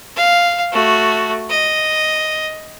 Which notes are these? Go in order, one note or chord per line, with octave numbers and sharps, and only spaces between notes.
F5
A3 F#4
D#5